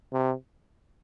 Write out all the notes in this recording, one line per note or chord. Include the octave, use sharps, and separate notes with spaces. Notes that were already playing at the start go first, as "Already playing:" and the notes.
C3